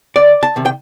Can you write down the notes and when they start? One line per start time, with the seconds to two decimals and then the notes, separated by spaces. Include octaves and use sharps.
0.16 D2 D5
0.43 A5
0.56 C3 D#3
0.65 G5